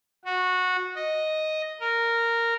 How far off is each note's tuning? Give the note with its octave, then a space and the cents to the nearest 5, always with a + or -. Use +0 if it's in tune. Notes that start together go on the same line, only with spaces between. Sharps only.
F#4 -15
D#5 +0
A#4 -10